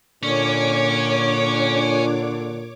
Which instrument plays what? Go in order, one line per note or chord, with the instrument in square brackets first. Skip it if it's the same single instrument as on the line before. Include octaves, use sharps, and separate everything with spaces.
[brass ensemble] A#2 [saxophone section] D3 D4 [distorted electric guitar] C#4 [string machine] C#5 D6